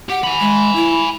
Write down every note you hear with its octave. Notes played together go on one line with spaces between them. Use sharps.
G4 F#5
G#5 B5
G#3
E4